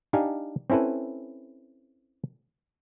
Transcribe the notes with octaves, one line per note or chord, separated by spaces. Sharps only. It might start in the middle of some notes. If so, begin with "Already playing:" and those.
D4 D#4 G4 F5 G#5
C4 C#4 E4 A4 B4